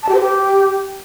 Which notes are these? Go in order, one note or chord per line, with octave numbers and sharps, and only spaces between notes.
A5
G4
C5
G4